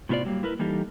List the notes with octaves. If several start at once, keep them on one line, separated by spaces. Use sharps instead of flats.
A2 C3 B3 F4 C5 D5
F#3 G3 A#3
E4 A#4 B4
E3 G3 A#3 D#4 G4 A4